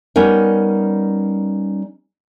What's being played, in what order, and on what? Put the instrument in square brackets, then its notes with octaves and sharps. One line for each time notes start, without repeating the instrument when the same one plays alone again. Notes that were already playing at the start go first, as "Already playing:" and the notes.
[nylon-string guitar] G3 B3 C#4 D#4 A#4